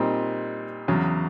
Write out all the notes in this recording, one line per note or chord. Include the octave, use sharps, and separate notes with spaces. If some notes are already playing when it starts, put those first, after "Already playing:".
Already playing: A#2 G3 C4 D#4
E2 C#3 F#3